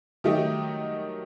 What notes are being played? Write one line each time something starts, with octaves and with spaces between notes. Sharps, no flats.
D#3 F#3 A3 D#4 G4